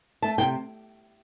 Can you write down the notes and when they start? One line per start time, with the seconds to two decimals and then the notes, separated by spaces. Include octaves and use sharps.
0.22 A3 A5
0.38 C3 G5